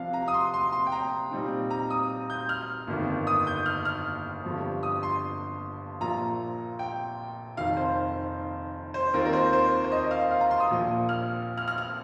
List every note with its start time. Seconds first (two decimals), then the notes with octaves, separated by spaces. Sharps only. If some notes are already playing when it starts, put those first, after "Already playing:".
Already playing: C2 C3 F3 F5
0.13 A#5
0.28 D#6
0.34 C6
0.54 C6
0.72 C6
0.87 G5
0.92 A#5
1.31 A#2 G3 C4 D#4
1.70 A#5
1.90 D#6
2.30 G6
2.49 F6
2.87 G1 F2 D#3 A#3
3.27 D#6
3.47 G6
3.66 F6
3.85 F6
4.44 G1 G2 F3
4.83 D#6
5.03 C6
6.00 A#1 A#2 F3 A#3 F4 A#5
6.79 G5
7.57 F1 F2 D#3 F5
7.77 C5
8.94 C5
9.14 D#2 D#3 C4 F4 A#4
9.25 A#4
9.33 C5
9.53 C5
9.84 C5
9.92 D#5
10.11 F5
10.31 F5
10.41 A#5
10.51 C6
10.60 D#6
10.70 A#1 A#2 F3 A#3
11.09 F6
11.58 F6
11.68 F6
11.78 F6